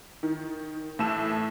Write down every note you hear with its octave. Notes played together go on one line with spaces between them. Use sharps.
D#3
A2 E3 A3 A4 E6 E7